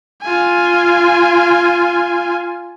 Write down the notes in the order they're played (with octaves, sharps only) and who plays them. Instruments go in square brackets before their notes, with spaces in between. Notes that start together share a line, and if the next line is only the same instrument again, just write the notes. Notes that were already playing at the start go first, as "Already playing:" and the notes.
[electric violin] F4 G#5